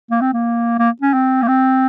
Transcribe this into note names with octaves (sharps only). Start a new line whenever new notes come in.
A#3
C4
A#3
A#3
C#4
C4
A#3
C4